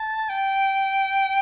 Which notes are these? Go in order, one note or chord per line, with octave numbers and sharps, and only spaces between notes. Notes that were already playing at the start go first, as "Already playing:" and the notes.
Already playing: A5
G5